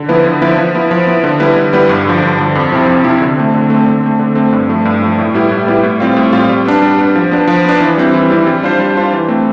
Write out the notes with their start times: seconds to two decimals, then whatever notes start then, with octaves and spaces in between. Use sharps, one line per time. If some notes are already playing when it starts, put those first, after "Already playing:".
Already playing: D3
0.09 F3 B3 E4 B4
0.26 D3
0.41 F3 B3 E4 B4
0.58 F3
0.75 B3 E4
0.91 F3
1.07 B3 E4
1.24 D3
1.40 G3 B3 E4 B4
1.57 D3
1.73 G3 B3 E4 B4
1.89 G2
2.05 D3 F3
2.23 G2
2.39 D3 F3
2.55 F2
2.71 C3 F3 C4 E4
2.88 F2
3.04 C3 F3 C4 E4
3.21 D3
3.37 A3 C4
3.54 D3
3.70 A3 C4
3.86 D3
4.03 A3 C4
4.19 D3
4.35 A3 C4
4.53 G2
4.69 F3 A3
4.85 G2
5.02 F3 A3
5.18 A2
5.34 G3 B3 E4 G4
5.51 A2
5.67 G3 B3 E4 G4
5.83 A2
6.00 G3 C4 F4
6.17 A2
6.33 G3 C4 F4
6.49 G3
6.66 B3 D4
6.82 G3
6.98 B3 D4
7.15 F3
7.31 B3 D4
7.48 F3
7.64 B3 D4
7.80 E3
7.97 G3 C4 E4
8.14 E3
8.30 G3 C4 E4
8.47 G3
8.63 D4 F4 C5
8.79 G3
8.95 D4 F4 C5
9.13 E3
9.28 A3 C4